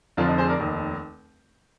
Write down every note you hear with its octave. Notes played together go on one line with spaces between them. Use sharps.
F1 F2 D3 F3 D4 F4
D#4
G#4 C5
A#4 D5
F1 D#2 D#3